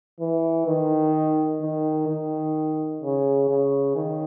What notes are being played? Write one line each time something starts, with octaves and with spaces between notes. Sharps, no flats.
E3
D#3
D#3
D#3
C#3
C#3
D#3